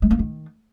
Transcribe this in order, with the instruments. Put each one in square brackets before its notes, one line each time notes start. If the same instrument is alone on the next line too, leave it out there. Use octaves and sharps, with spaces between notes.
[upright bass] G#3
A#3
D#3